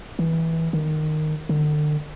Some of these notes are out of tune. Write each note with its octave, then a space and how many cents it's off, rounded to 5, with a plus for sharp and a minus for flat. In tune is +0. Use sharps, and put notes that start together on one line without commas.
E3 -15
D#3 -15
D3 +40